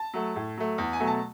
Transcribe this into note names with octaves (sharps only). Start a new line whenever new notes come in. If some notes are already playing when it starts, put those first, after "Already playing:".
Already playing: A5
F#3 A3
A2
F#3 A3
E2
G#5
B2 F#3 A3
A5